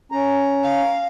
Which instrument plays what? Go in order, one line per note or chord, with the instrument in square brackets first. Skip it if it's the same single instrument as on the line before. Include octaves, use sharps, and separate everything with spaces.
[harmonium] C#4 A#5
[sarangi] F5